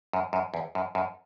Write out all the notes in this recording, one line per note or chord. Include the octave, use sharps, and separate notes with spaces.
F#2
F#2
E2
F#2
F#2